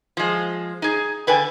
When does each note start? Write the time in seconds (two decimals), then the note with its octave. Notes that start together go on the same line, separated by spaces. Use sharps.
0.17 F3 G#3
0.82 D#4 G#4
1.27 D3 B4 D5 G5 G#5